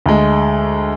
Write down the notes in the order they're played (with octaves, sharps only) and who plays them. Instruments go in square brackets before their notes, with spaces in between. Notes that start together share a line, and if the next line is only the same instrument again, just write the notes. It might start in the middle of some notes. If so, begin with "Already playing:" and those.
[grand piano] D2 G#3